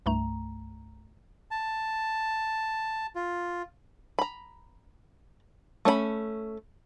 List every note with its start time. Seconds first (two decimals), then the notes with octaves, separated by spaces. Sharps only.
0.06 C2 G2 A3 A#5
1.51 A5
3.15 F4
4.19 A#5 B5
5.85 A3 C#4 C5 B5